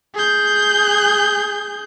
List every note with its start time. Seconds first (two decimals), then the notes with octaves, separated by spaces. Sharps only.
0.14 G#4 G6